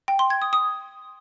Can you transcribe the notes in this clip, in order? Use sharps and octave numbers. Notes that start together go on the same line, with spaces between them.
G5
C6
G#6
D#6
D#6